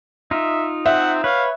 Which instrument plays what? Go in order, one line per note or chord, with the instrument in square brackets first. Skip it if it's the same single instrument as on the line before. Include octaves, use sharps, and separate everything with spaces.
[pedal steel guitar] D#4 F4 [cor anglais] E5
[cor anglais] C4 [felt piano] E5 [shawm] F#5
[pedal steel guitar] B4 [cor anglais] C#5 [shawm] F5